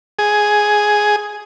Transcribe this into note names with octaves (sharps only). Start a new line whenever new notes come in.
G#4